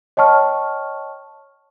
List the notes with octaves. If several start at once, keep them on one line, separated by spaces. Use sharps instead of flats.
C#5 D#5 G5 A5 C#6 F6